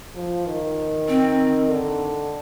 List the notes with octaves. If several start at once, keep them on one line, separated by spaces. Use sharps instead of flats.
F3
D#3
C4
D3